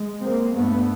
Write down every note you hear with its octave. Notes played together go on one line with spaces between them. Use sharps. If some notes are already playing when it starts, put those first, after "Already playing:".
Already playing: G#3
A#3 C4
G2 A3 B3